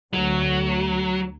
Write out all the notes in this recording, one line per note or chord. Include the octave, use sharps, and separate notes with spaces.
D2 F#3